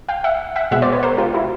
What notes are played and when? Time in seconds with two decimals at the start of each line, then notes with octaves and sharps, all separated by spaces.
0.08 F5 G5
0.24 E5 F#5
0.56 E5 F#5
0.71 B2 G#3 B3 E5 F#5
0.82 C5 D5
0.92 B4 C#5
1.03 A#4 C5
1.18 F4 G4
1.34 E4 F#4